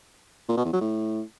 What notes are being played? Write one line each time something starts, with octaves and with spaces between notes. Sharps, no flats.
A#2
B2
E2
F#3
A2